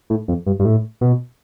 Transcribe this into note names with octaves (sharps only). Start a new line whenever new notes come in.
A2
F2
G2
G2
A2
B2